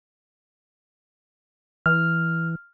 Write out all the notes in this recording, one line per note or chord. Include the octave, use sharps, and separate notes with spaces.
E3 F6